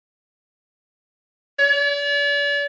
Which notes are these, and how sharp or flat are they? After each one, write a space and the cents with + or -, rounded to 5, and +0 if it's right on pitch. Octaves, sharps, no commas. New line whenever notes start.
D5 -45